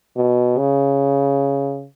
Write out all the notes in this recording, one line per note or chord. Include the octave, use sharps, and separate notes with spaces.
B2
C#3